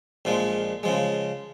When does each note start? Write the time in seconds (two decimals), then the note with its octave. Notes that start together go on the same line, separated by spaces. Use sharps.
0.25 A#1 A#2 F3 G#3
0.83 C#3 F3 G#3